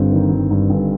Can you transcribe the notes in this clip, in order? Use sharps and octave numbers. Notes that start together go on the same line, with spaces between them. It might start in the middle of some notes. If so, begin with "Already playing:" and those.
Already playing: G1 G2 C4
D#3
G1
G2
G1